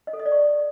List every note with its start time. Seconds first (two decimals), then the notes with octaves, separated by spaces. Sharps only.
0.07 D#5
0.13 A4
0.19 D#5
0.26 D5
0.32 C#6